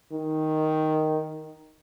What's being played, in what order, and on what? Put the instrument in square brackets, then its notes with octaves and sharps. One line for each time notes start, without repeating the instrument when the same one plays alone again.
[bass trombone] D#3